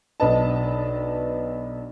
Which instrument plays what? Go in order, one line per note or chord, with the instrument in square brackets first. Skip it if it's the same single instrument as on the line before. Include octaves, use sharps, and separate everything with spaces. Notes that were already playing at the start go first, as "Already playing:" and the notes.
[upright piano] B1 D4 B4 D#5 A5